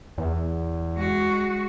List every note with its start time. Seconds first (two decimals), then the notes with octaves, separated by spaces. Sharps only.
0.18 E2
0.96 G#3 F#4